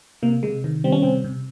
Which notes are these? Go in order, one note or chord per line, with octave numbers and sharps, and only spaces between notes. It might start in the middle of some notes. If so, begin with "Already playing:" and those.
C3 A#3
C3 G#3
D#3
G3 C4
C#4
C3 C4
C3